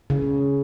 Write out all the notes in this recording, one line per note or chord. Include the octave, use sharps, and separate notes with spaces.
C#3